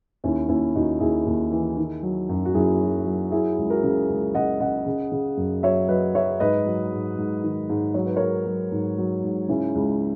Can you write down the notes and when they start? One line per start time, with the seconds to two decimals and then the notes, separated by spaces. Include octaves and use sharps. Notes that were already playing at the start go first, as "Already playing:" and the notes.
0.24 D#2 C#4 E4
0.49 D#2 C#4 E4
0.75 D#2 D#4 F#4
1.00 D#2 E4 G#4
1.26 D#2
1.52 E3
1.77 D#3
2.03 F#3
2.29 F#2
2.45 F#4
2.54 F#2 E4 G#4
2.81 F#3
3.06 F#3
3.31 F#3 E4 G#4
3.58 C#2
3.70 F#4 A#4
3.83 C#3
4.09 C#2
4.34 C#3 D#5 F#5
4.60 C#3 D#5 F#5
4.86 C#3
5.12 C#3
5.37 F#2
5.63 F#3 C#5 E5
5.88 F#3 B4 D#5
6.14 F#3 C#5 E5
6.40 G#2 B4 D#5
6.66 F#3
6.92 G#2
7.18 G#2
7.43 D#3
7.70 G#2
7.94 F#3 C#5
8.06 B4
8.16 G#2 A#4 C#5
8.46 F#3
8.72 G#2
8.98 F#3
9.24 G#2
9.48 C#3 C#4 E4
9.75 C#2